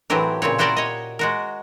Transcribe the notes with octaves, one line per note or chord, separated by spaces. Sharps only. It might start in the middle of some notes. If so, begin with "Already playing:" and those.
A2 E3 F#3 C4 G4 A#4
A#2 C#3 C4 C#5
E4 F#4 G4 A#4 C5 D5
C#5 D#5
G#3 F#4 A#4